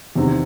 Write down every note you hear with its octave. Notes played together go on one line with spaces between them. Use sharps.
E2 C3 D#3